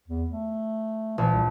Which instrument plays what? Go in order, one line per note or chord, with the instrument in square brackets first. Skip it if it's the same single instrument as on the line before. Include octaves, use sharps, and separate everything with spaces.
[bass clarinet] E2
A3
[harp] A#1 [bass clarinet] E3
[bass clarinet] C2